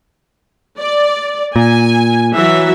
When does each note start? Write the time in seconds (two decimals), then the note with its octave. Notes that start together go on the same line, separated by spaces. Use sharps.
0.79 D5
1.56 A#2 G#5
2.33 E3 F#3 E5